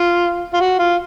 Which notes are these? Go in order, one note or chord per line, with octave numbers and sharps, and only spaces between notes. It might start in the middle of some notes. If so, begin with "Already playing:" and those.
Already playing: F4
F4
F#4
F4